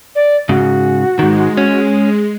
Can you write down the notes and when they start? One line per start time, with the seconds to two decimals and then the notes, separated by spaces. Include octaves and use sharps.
0.15 D5
0.49 G#2 C#3 F#4
1.19 G#2 D#3 G#3
1.57 C#4